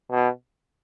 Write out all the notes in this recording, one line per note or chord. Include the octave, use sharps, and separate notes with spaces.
B2